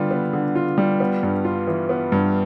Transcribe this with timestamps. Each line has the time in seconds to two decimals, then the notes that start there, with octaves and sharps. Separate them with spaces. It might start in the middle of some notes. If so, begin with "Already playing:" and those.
Already playing: D3 G3 B3 F4
0.11 B3
0.33 D3
0.55 F4
0.78 G3
1.00 B3
1.23 G2
1.45 F4
1.67 E3
1.89 B3
2.12 G2